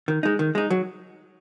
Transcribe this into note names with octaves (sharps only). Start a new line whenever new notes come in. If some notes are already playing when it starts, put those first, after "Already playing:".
D#3
G#3 D#4
D#3
G#3 D#4
F#3